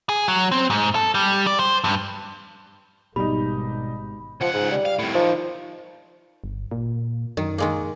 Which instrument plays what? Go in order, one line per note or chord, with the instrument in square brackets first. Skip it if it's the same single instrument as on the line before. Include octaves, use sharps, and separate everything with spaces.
[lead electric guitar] G#4
F#3
C4
G#2
A4
G3
D5
C5
G2
[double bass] G#1 [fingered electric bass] B2 [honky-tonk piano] G3 D#4 [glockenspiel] B5
[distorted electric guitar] C#2 F#5 [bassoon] F3
[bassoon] G#2
G3
[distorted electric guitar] F5
C2 A2
[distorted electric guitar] D#3 [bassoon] F3
[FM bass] G1
A#2
[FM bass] F#2 [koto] D#3
[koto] D#3 G#3 A#3